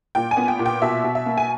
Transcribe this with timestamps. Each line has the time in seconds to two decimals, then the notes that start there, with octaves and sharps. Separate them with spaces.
0.15 A#2 G5
0.31 G#5
0.37 B3
0.48 G5
0.59 A#2
0.66 G5
0.82 B2 E5
1.04 B2
1.15 E5
1.26 A#3
1.37 G#5